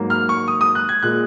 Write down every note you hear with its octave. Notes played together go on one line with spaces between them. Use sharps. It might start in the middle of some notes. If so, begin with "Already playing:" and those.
Already playing: G#2 F#3 A#3
F6
C#6
D#6
D#6
F#6
G#6
A#2 G#3 F#6